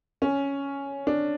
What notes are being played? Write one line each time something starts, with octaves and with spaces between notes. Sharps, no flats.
C#4
D4